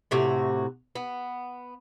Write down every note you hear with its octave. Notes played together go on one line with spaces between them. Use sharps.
A2 C3 F#4
B3